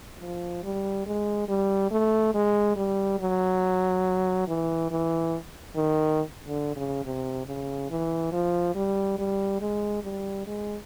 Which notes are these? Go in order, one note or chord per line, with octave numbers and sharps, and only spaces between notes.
F3
G3
G#3
G3
A3
G#3
G3
F#3
E3
E3
D#3
D3
C#3
C3
C#3
E3
F3
G3
G3
G#3
G3
G#3